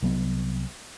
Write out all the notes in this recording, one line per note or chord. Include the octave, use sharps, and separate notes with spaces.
C2 F#3 B3